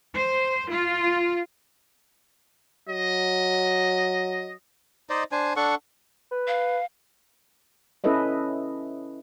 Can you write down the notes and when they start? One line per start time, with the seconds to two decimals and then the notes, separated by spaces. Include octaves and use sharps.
0.14 C5
0.69 F4
2.89 F#3 D#5
5.10 D#4 C5 D5 D#5
5.32 D4 C5 G#5
5.56 D4 A4 F#5 C#6
6.31 B4
6.47 F5
8.04 C#4 E4 A4 B4 D#5 E5